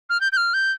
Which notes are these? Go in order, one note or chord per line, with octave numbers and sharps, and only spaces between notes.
F6
G6
G6
F6
G6